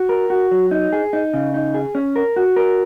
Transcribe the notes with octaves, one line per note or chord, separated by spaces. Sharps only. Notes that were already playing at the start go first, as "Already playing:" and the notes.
Already playing: F#4
A#4
F#4
F#3
D#4
G#4
D#4
C#3
D#4
G#4
C#4
A#4
F#4
A#4